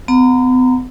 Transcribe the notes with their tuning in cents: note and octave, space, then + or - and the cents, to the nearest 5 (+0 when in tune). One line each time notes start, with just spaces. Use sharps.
B3 +45 F#5 -35 A#5 +0